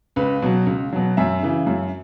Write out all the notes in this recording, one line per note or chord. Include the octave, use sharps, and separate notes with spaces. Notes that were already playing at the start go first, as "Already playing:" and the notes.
C#2 B4
B2 F#3
C#2
B2 F#3
F#2 E5
C#3 E3
F#2